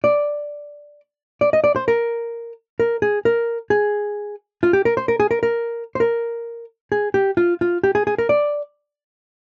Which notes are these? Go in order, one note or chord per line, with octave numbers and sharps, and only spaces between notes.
D5
D5
D#5
D5
C5
A#4
A#4
G#4
A#4
G#4
F4
G4
A#4
C5
A#4
G#4
A#4
A#4
C5
A#4
G#4
G4
F4
F4
G4
G#4
G#4
A#4
D5